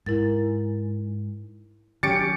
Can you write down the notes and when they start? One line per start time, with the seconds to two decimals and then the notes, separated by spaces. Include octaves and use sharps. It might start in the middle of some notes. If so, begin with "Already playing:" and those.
0.06 G#2 E4 A#4 A6
2.03 D#3 F#3 C#4 G4 A6 C#7 D7